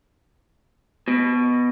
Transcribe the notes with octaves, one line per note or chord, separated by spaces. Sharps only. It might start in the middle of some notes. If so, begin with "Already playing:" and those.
B2